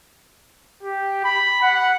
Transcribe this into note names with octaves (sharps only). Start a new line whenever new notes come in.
G4
B5
F#5